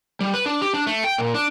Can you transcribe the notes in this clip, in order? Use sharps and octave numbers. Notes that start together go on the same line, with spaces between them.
G3
B4
D4
G4
D4
A3
G5
A#2
D4